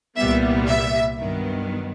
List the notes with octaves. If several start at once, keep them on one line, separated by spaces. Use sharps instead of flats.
C2 A#2 G3 B3 E5
E5
G2 D#3 F#3 B3